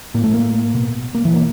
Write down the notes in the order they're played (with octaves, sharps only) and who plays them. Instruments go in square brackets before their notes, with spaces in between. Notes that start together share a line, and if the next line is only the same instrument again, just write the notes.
[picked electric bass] A2 A#3
A3
A#3
B2
A#3
E3
B2 A#3